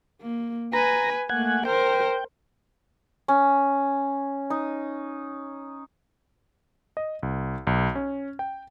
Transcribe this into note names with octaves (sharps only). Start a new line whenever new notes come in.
A#3
B4 G#5 A#5
A3 A#3 F#5 G#5
A#4 C5 G5
C#4
D#4
D#5
C2
B1
C#4
G5